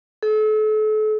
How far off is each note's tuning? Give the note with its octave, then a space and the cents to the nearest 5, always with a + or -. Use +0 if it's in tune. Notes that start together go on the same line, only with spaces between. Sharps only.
A4 -35